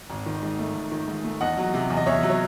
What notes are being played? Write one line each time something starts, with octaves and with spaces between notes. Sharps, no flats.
G#1
D#3
G#2
A3
G#1
D#3
G#2
A3
E2 D#5 F#5
F#3
C3
E2
D#5
E2 C#5 E5
F#3
C#5